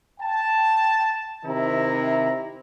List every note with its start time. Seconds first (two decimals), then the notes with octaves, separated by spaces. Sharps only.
0.20 G5 A5
1.44 C3 D#3 E4 A#5